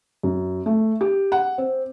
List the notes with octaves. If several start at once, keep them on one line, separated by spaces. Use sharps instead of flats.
F#2
A3
G4
F#5
C4